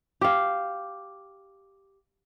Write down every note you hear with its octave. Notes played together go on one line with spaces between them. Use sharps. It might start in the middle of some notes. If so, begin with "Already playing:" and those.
G4 F5